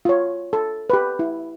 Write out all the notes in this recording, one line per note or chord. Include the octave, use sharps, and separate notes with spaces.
F4 C#5
A4
G4 B4
E4